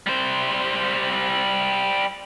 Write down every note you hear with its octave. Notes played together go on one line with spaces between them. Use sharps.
G3 C5